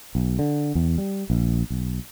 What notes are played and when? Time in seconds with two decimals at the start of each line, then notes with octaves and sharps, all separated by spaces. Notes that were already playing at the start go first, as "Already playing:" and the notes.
0.15 B1
0.39 D3
0.75 E2
0.98 G3
1.30 A#1
1.70 B1